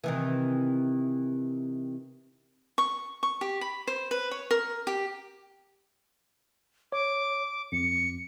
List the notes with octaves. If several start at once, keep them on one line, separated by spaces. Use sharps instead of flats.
C3 D#3 E3
C#6
C#6
G4
B5
C5
B4
C#5
A#4
G4
C#5 D6
F2 C#7